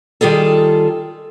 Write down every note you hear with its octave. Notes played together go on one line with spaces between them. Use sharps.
D#3 G3 F4 G#4 A4